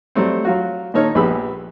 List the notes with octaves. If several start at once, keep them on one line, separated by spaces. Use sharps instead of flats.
F#3 G3 A3 C4
F#3 F4 F#4
A#2 D#3 D#4 A4 C#5 F6
A#1 B3 G4 G#4 B5 E6